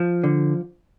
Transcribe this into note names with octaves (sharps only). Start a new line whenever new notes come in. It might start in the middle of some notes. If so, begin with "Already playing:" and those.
Already playing: F3
D3